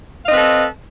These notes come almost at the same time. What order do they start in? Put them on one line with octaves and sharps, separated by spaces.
F5 D#5 C4 B4 A4